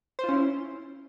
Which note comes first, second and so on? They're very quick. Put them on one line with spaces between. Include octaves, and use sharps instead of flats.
C5 F4 C#4 E4